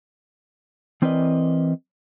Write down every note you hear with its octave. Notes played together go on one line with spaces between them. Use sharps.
E3 C4 A#4 B4 D5 D#5